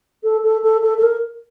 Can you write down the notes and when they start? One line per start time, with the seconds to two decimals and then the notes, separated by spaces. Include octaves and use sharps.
0.24 A4
0.44 A4
0.63 A4
0.83 A4
0.98 A4
1.03 A#4